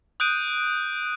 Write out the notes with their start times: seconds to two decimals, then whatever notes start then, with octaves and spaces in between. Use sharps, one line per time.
0.20 D#6 F#6 G6 D7 D#7